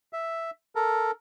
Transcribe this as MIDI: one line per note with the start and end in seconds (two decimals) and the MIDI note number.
0.13 0.51 76
0.75 1.11 69
0.75 1.11 70